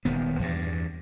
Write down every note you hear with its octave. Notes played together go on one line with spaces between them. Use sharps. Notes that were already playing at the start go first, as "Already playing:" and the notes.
D#1 D#3 B3
E2 G2